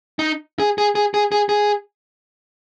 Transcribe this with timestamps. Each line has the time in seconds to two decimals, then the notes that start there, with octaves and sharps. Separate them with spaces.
0.19 D#4
0.59 G#4
0.78 G#4
0.95 G#4
1.14 G#4
1.32 G#4
1.49 G#4